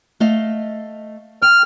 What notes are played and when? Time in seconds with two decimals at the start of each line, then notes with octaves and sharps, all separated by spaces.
0.20 A3 D#5 F5
1.42 G5 F6